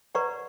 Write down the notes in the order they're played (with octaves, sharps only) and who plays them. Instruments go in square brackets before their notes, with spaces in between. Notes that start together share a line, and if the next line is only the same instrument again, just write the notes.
[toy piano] B4 D5 F#5 A#5 C#6